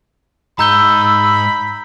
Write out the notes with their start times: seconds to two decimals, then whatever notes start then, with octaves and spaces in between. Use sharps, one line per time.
0.59 G#2 D#4 A#5 B5 E6 G6 G7